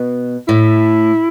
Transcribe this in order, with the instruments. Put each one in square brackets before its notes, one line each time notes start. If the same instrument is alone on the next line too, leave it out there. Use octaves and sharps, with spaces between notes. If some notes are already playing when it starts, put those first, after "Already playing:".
Already playing: [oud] B2
[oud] A2 [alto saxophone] E4